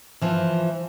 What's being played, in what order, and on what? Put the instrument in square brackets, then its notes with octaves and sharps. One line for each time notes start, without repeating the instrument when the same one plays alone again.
[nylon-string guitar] E3 F3